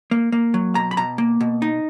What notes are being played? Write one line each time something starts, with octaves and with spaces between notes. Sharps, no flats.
A#3
A#3
F#3
B2 A#5
B5
B2 A#5
A#3
B2
D#4